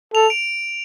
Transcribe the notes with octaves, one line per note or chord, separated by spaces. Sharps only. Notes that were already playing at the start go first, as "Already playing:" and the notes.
A4 F7
D7